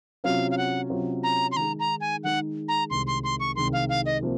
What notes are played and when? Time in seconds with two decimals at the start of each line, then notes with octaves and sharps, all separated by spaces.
0.24 C3 F#3 C#4 F4 F5
0.51 F5
0.58 F#5
0.90 C3 F#3 C#4 F4
1.23 A#5
1.52 C6
1.56 D#3 G#3 D#4 G#4 A#5
1.80 A#5
2.01 G#5
2.24 D#3 G#3 D#4 G#4 F#5
2.68 A#5
2.90 C2 C3 D#3 G#3 C6
3.07 C6
3.24 C6
3.40 C#6
3.56 C2 C3 D#3 G#3 C6
3.73 F5
3.89 F5
4.06 D#5
4.22 C3 F3 A#3